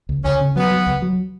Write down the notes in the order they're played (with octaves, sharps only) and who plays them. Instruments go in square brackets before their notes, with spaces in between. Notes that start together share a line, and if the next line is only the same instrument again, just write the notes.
[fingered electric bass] C#2
[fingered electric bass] C#2 [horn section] C#4
[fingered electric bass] C#3
[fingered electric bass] F#3 [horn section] B3
[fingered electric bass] F#3
C#2
F#3